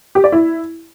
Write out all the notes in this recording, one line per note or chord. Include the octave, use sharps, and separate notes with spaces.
G4
D5
E4